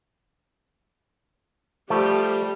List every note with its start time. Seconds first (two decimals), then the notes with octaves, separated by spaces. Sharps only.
1.90 F3 G3 A3 G4